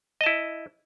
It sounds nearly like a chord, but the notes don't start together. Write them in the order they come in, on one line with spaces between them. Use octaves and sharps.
D#5 A5 E4